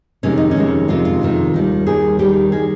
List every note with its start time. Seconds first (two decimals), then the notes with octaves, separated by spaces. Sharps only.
0.23 F2 C3 D#3 G#3 C#4
0.38 D#4
0.51 C#4
0.56 F2 C3 D#3 G#3
0.88 F2 C3 D#3 G#3 F4
1.05 F4
1.21 F2 C3 D#3 G#3
1.54 D#2 D#3 G3
1.86 D#2 D#3 G3 G#4
2.19 D#2 D#3 G3 G4
2.52 D#3 G3 G#4